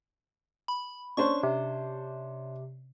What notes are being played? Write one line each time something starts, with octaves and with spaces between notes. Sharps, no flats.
B5
C#4 D4 C5 C#6
C3